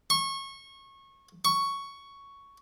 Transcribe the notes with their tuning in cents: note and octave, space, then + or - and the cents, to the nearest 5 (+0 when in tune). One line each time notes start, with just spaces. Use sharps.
C#6 -25
C#6 +5